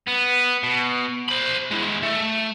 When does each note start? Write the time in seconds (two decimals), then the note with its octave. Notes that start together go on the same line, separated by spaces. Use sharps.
0.07 B3
0.63 B2
1.28 C5 B5
1.71 G#3 E4
2.03 A3